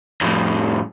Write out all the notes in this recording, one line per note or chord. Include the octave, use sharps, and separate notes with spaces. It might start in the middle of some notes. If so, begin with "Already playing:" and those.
F2 A2